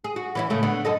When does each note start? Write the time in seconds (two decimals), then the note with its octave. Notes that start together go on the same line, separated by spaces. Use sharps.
0.04 G#4
0.16 F#4
0.35 E3 C#4 E4
0.50 A2 C#3 A3
0.63 D3 B3
0.85 F#2 A4 D#5